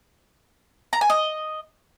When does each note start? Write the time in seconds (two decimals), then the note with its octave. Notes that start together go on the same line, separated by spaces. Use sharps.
0.93 A#5
1.01 G#5
1.10 D#5